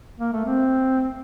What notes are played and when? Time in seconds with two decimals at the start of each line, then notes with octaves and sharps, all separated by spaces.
0.19 A#3
0.32 A3
0.45 C4